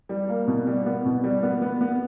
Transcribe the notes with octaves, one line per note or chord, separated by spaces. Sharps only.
G3
A#3
B2
G3
B3
B2
G3
B3
B3
B3